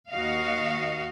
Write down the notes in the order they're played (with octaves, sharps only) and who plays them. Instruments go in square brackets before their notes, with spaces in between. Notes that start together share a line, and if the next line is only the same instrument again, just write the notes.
[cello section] D#2 F#4 D#5 F5